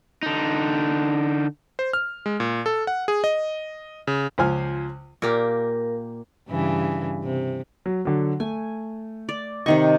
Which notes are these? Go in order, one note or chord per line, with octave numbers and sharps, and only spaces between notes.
D3 D#4
C5
F6
G#3
A#2
A4
F#5
G#4
D#5
C#3
C#2 F3 C5 G#5 F6
A#2 A#3 G4 A#4
G2 C#3 E3
C3
F#3
D3 F#3
A3 G#5
D5
C3 D#3 D#5 C#6